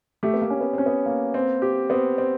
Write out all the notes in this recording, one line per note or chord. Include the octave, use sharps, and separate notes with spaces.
A3 G4
B3
A#3
C#4
B3
C4 C#4
B3
A#3
C4
G4
B3 C4
C4